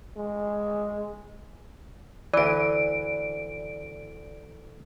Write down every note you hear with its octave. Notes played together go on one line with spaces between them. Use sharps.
G#3
D2 E3 D5 D7